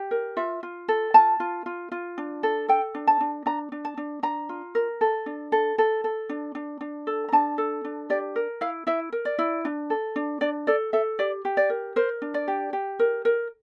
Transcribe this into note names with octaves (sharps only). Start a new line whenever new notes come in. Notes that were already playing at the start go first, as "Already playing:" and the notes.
Already playing: G4
A#4
F4 E5
F4
A4
F4 A5
F4
F4
F4
D4
A4
A4 G5
D4
A5
D4
D4 A#5
D4
A5
D4
D4 A#5
F4
A#4
A4
D4
A4
A4
A4
D4
D4
D4
A4
A#5
D4 A5
A4
D4
G4 D5
A#4
E4 F5
E4 E5
A#4
D5
E4
D4
A4
D4
D4 D5
A4 D5
A4 E5
G4 D5
G4
D5
A#4
A#4 C5
D4
D5
G4
G4
A#4
A#4